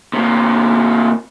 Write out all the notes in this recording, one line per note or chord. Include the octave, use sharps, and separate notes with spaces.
C3 A#3